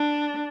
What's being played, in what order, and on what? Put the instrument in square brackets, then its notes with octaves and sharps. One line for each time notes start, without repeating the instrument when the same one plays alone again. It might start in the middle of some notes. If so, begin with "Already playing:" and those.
Already playing: [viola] D4